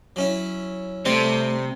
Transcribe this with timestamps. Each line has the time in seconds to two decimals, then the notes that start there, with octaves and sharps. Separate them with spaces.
0.16 F#3 C#4 E4
1.05 C3 G3 A3 C4 C5